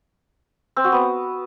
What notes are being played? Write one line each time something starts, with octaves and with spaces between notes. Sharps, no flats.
C4
F#4
B3